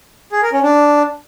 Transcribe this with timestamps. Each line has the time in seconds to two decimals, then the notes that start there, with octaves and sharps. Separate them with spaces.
0.32 G#4
0.42 A#4
0.53 C#4
0.63 D4